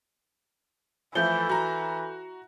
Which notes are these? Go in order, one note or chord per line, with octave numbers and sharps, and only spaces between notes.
E3 F3 A3 E4 A4 G6 G7
F#4 A#5